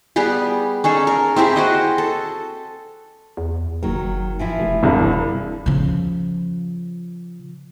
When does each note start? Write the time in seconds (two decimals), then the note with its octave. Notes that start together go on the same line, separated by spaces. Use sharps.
0.16 G3 B3 G4 G#4
0.84 C#4 D#4 G#4 A4
1.07 A#4
1.36 C4 E4 G4 G#4
1.56 F#4 C5 D#5
1.98 A4
3.37 E2
3.83 F#1 D#3 F#3
4.39 E3 F3 E4
4.60 F1
4.83 E1 C2 G2
5.66 C#3 F3